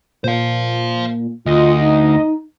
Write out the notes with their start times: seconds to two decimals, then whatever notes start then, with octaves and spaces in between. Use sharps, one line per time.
0.24 A#2 C5 F5
1.46 D2 F4 D#5
1.81 D#4